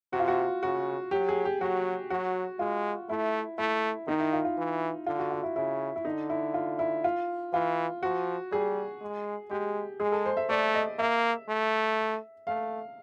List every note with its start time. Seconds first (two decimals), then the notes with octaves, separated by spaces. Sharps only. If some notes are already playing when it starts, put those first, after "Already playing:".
0.13 C3 F#4
0.20 F4
0.28 F#4
0.63 C#3 F#4
1.11 F#3 G4
1.29 G#4
1.45 G4
1.61 F#3 F#4
2.10 F#3 F#4
2.59 G#3 F4
3.09 A3 E4
3.58 A3 E4
4.08 D#3 D#4
4.20 E4
4.33 F4
4.45 F4
4.58 E3
5.06 D3 F4
5.19 F#4
5.32 F4
5.43 E4
5.56 C#3 E4
5.96 E4
6.05 D3 D#4
6.30 E4
6.54 F4
6.79 E4
7.04 F4
7.53 E3 F4
8.03 F3 F#4
8.52 G3 G#4
9.01 G#3
9.50 G#3 G4
10.00 G#3 G#4
10.12 A4
10.25 C5
10.37 E5
10.49 A3 D5
10.74 D#5
10.99 A#3 E5
11.49 A3
12.47 A3 F5